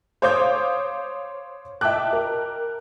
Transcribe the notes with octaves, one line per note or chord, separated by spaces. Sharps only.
C5 C#5 F5 D6 D#6 G6
D#5 E5 G5 A5 D6 F#6
A#4